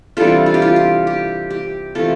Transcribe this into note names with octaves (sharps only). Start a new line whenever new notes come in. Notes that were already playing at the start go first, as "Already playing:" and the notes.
C3 E3 G3 D4 F4 A4
F4
G4
F4
G4
G4
G4
C3 E3 A3 F4 A4